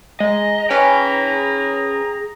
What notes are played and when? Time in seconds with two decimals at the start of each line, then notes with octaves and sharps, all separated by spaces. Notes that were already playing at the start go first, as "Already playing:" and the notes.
0.20 G#3 D#5 A#5
0.70 C#4 G#4 B4 G5